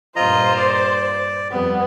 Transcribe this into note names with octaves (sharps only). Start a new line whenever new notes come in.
G2 A#2 F4 C5 D#5 A#5
D5
F2 G3 B3